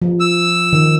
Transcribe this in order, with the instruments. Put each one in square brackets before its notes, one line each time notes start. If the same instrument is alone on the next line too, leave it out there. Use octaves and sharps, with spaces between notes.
[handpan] F3
[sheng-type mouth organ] E6
[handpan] D#3